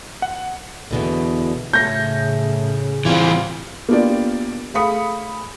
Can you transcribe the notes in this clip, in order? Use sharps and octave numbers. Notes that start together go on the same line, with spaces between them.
F#5
E2 B2 D3
A2 C#3 A3 C#5 G6 A#6
E3 G3 C4 F4 G4
A#3 B3 D4 F4 G4 D5
A3 G#4 F5 B5 D#6 C#7